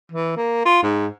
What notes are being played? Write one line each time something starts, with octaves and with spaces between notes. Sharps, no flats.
E3
A#3
F4
G#2